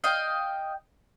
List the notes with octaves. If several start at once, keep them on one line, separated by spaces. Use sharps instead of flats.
D#5 F5 G5